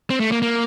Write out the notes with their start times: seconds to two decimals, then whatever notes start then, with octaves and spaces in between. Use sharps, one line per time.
0.10 C4
0.20 A3
0.32 A#3
0.42 A#3